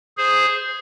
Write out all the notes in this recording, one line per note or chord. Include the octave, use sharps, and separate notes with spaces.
G#4 C5